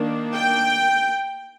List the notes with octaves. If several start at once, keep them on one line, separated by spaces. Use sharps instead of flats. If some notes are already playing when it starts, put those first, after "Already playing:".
Already playing: D#3 A#3 D4
G5